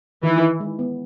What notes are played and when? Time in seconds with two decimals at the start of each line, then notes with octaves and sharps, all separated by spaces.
0.23 D#3 E3
0.41 D#4
0.60 G#3
0.79 B3